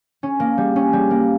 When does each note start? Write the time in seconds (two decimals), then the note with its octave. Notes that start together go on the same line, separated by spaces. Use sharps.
0.23 C#4
0.40 A#3
0.58 G3
0.76 C#4
0.93 G3
1.10 A#3